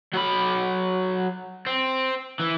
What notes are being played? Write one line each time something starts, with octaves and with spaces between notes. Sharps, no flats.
F#3 B5
C4
E3